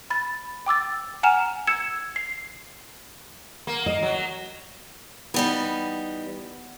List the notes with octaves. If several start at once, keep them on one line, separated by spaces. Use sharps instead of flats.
B5 A6
G5 D6 E6 A6
F#5 G#5 A#5 F6 E7 F7
E6 G#6 C#7 E7
C7
A#3
D#5
F#3
E3 G3 B3 D#4